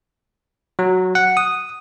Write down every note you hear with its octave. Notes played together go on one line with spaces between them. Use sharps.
F#3
F#5
D#6